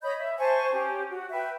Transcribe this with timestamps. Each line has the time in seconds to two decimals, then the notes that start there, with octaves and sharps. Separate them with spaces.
0.03 C#5 D#5 B5 G6
0.18 E5
0.39 C5 G#5 A5 C#6
0.72 C#4 G4
1.10 F#4
1.31 B4 E5 G5